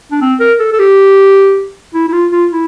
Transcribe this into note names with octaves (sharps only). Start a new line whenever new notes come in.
D4
C4
A#4
A4
A4
G4
E4
E4
F4
F4
E4